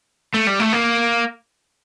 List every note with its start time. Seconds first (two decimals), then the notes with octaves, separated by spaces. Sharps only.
0.34 A3
0.47 G3
0.60 A3
0.73 A#3